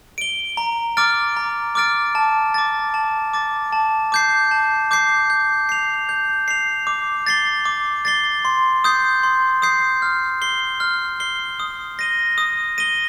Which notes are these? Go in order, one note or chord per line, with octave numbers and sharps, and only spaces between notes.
D7 G7
A#5
D6 F6 A6 D7
A#5
D6 F6 A6 D7
A5
D6 A6
A5
D6 A6
A5
D6 G6 C7
A5
D6 G6 C7
G6
C7 F7
G6
C7 F7
D6
A6 C7 G7
D6
A6 C7 G7
C6
D#6 G6 C7
C6
D#6 G6 C7
F6
C7 G7
F6
C7 G7
D#6
A#6 D#7 G7
D#6
A#6 D#7 G7